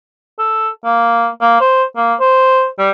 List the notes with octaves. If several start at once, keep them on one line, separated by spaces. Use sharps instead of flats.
A4
A#3
A#3
C5
A#3
C5
G3